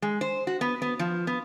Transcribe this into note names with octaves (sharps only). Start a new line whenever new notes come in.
G#3
C5
F#4
B3
B3
F3
B3